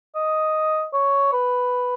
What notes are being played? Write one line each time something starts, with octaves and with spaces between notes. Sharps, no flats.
D#5
C#5
B4